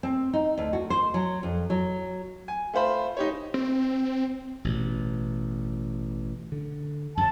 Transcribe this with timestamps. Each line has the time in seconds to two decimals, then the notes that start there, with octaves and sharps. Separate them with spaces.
0.03 C4
0.33 D#4
0.57 D2
0.73 F#4
0.90 C5
1.14 F#3
1.43 F2
1.70 F#3
2.48 G#5
2.73 A3 F4 C5 B5
3.17 D#4 G4 C#5
3.54 C4
4.64 A1 B2
6.52 D3
7.17 F#2 F#3 A5